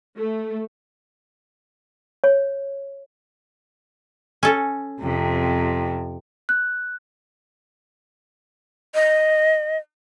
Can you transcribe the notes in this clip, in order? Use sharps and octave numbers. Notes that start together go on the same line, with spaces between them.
A3
C#5
C#4 A4
F2 C3
F#6
D#5